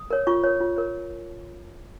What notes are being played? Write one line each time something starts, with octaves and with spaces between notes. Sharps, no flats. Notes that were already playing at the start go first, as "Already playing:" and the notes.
Already playing: D#6
A#4 C#5
F4 C#6
A#4 C#5
F4
A#4 C#5